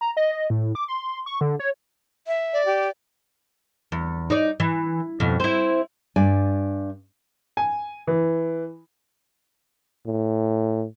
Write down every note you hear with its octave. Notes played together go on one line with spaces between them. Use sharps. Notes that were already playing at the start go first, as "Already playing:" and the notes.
A#5
D#5
D#5
A2
D6
C6
C#6
D3
C#5
E5
D5
G4
E2
D#4 D5
E3
F2 B2
C4 E4
G2 D5 G#5
G#5
E3
A2